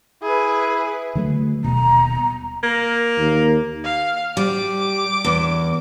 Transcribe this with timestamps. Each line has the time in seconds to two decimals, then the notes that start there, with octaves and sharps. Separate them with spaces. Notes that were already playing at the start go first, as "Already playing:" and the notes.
0.23 E4 G#4 B4
1.15 D3 F#3 A3
1.64 D#1 B2 A#5
2.63 A#3
3.18 D#2
3.84 F5
4.37 G3 D6
5.25 E2